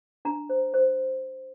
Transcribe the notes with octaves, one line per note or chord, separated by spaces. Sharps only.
D4 A#5
C5
C5